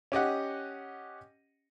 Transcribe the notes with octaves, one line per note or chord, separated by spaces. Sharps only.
C#4 G4 D#5 F#5